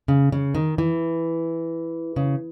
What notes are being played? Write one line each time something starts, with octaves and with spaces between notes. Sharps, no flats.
C#3
C#3
D#3
E3
C#3